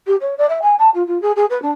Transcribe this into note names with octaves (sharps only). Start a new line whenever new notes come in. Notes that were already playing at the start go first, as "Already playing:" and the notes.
G4
C#5
D5
E5
G#5
A5
F4
F4
G#4
G#4
B4
D4